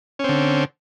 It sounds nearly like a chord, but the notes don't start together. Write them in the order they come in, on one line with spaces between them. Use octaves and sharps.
C#4 C4 D3